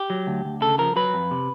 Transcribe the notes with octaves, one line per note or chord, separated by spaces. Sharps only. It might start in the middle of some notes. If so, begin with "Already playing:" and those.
Already playing: G4
F#3
D2
D2
C#3 A4
F3 A#4
F#3 B4
F2
C3